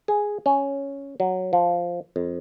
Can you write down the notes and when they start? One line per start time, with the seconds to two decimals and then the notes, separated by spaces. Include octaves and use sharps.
0.08 G#4
0.46 C#4
1.20 F#3
1.53 F3
2.16 F2